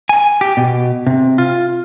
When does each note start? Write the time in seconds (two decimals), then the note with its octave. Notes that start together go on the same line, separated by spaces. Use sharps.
0.09 G#5
0.41 G4
0.57 B2
1.07 C3
1.38 F4